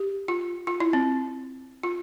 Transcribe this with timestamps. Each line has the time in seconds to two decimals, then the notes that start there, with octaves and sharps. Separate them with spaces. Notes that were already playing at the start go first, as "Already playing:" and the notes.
Already playing: G4
0.28 F4
0.67 F4
0.80 E4
0.93 C4
1.83 F4